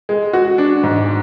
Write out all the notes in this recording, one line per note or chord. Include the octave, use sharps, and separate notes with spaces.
G#3
F#4
D4
G#2